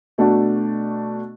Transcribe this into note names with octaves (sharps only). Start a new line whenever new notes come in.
B2 A3 D4 F#4